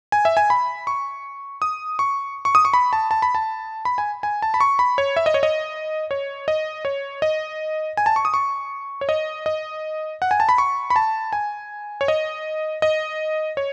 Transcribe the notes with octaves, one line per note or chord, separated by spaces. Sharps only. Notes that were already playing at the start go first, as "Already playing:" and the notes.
G#5
E5
G#5
B5
C#6
D#6
C#6
C#6
D#6
C#6
B5
A5
A5
B5
A5
B5
G#5
G#5
A5
B5
C#6
B5
C#5
E5
D#5
C#5
D#5
C#5
D#5
C#5
D#5
G#5
A5
C#6
D#6
C#6
C#5
D#5
D#5
F#5
G#5
A5
B5
C#6
B5
A5
G#5
C#5
D#5
D#5
C#5